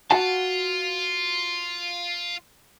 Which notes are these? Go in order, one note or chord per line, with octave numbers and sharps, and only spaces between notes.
F4 F#4 F#5 A5